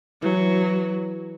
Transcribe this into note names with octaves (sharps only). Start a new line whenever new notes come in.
E3 F#3